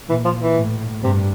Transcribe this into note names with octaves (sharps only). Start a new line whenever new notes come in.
A#2 E3
F3
E3
A2
G2 C3